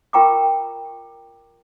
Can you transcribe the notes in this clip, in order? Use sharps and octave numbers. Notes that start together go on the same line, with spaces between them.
F4 A#4 G5 A#5 C#6 D6